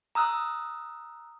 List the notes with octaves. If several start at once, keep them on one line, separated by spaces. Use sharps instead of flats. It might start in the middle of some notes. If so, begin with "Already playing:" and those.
A#5 D#6 E6 F#6